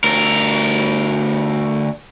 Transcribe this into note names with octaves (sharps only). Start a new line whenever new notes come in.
D2 A#4